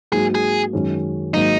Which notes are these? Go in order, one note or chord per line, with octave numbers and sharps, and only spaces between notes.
G#2 F#3 A#3 F#4 G#4
G#4
F#2 D#3 G#3 C#4
G#2 D#3 F#3 A#3 D#4